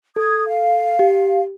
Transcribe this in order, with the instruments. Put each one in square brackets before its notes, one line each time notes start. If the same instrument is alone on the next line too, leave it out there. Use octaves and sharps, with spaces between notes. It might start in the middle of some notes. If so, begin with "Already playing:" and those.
[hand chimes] A4 [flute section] D#6 G#6
[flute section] F5
[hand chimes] G4